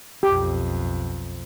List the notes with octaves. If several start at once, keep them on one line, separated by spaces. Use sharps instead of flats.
B1 F2 G4